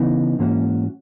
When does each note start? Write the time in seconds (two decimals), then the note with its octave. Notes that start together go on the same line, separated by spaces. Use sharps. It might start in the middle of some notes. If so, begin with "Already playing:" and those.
Already playing: C#3 E3 B3 D#4
0.39 G#2 E3 A#3 C#4 F#4